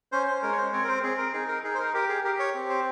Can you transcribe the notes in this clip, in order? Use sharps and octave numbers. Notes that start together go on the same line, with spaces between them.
C#4 C5
C5
G#3 A#4
C#5
C5
C4 C#5
A#4
C5
C4 G#4
A#4
D#4 G#4
A#4
D#4 G#4
C5
A#4
G4 A#4
G#4
G4 A#4
C#5
C4
C5